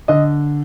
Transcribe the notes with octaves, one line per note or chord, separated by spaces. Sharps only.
D3 D#5